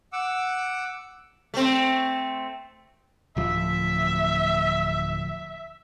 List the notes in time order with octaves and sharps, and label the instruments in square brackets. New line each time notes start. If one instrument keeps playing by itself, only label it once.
[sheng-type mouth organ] F#5 D6 E6
[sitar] A3 C4
[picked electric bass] D1 F3 [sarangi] E5